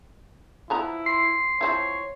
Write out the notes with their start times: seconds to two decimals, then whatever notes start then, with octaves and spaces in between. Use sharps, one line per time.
0.70 F3 B3 E4 A#5
1.06 C6 C7
1.61 F3 C4 E4 C#5